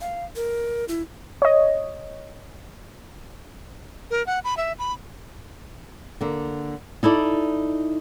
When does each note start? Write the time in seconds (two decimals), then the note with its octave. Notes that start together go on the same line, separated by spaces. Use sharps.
0.01 F5
0.36 A#4
0.88 E4
1.42 C#5 D#5
4.10 A#4
4.26 F#5
4.44 B5
4.57 E5
4.79 B5
6.21 D3 A#3
7.03 D#4 E4 A4 D5